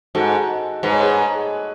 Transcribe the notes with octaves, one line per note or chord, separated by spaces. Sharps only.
G#2 F#4 A4
G#2 B4
C#5
G#4 B4